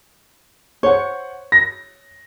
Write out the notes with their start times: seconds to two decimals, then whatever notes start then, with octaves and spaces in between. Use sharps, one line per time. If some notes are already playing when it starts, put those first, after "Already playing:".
0.83 C5 C#5 F#5
1.52 A#6